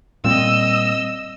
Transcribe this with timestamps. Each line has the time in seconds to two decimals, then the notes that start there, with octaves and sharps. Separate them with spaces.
0.24 A#2 G3 C4 D#5 E6